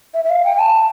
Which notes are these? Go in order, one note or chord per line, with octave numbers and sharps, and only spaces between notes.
E5
E5
F5
G5
A5